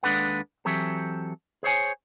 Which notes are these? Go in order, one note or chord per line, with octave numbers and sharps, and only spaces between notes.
D#2 G#3 D4 A4 B4 F#5
E3 F#3 C4 G4 A4
G#4 C5 C#5 G#5